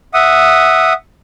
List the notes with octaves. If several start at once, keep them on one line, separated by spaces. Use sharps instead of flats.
E5 F#5 D#6